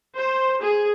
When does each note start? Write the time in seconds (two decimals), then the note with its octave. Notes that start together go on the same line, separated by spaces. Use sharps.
0.14 C5
0.59 G#4